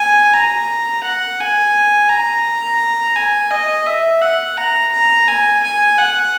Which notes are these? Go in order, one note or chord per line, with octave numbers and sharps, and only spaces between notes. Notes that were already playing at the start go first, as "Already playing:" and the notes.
Already playing: G#5
A#5
F#5
G#5
A#5
G#5
D#5
E5
F#5
A#5
A#5
G#5
G#5
F#5